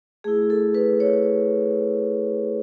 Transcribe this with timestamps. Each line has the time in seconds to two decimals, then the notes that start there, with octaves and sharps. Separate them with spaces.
0.24 A3 E4 G#4
0.50 A4
0.75 B4
1.00 C#5